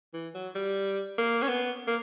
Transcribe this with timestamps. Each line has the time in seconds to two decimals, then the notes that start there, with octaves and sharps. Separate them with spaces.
0.14 E3
0.35 F#3
0.55 G3
1.18 A#3
1.42 C#4
1.49 B3
1.88 A#3